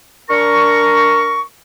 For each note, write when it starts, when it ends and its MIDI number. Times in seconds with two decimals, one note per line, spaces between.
0.30 1.40 62
0.30 1.40 70
0.30 1.40 82
0.30 1.40 85